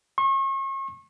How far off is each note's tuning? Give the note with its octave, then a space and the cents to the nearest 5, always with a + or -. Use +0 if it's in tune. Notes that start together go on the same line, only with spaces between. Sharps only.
C#6 -40